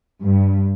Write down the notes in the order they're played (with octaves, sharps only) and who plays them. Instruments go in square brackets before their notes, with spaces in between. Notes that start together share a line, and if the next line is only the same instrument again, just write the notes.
[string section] G2